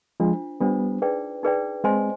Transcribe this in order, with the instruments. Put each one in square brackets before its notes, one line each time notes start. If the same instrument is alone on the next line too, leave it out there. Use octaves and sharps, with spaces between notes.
[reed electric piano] F3 G#3 [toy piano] D4 F4 C5
[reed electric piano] G3 B3 [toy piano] D4 F4 C5
[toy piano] D#4 G#4 B4 D5 G5
D#4 G#4 B4 D5 G5
[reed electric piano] G#3 C4 [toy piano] C5 D#5 G#5 C6